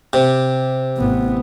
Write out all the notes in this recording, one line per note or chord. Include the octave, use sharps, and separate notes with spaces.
C3
A1 B3